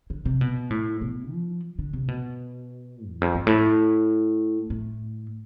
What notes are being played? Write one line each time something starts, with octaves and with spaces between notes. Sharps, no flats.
D3
C3
B2
A2
B2
F3
D3
C3
B2
E2
F2
G2
A2
A2